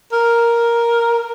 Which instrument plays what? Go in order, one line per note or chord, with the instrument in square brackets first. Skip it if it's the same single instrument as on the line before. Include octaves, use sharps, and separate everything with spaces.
[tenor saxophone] A#4